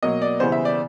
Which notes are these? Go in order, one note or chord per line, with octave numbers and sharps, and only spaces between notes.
B2 F#3 A#3 D#5
D5
C#3 E3 G3 B3 C5
E5
D5